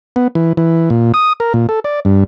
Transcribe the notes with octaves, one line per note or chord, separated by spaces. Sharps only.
B3
E3
E3
A#2
D#6
A#4
A#2
A4
D5
G2